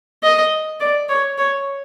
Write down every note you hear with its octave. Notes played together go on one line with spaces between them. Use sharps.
D#5
D5
C#5
C#5